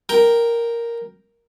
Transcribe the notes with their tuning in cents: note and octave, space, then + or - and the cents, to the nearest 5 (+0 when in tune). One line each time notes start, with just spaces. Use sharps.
A#4 +0 G5 +0